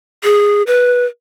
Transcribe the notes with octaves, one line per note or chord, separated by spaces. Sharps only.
G#4
B4